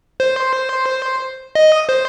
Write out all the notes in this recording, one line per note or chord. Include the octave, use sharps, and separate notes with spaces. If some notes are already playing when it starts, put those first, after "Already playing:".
C5
D#5
C5